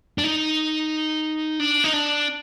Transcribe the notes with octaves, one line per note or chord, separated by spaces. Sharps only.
D4
D#4
D4
D#4
D4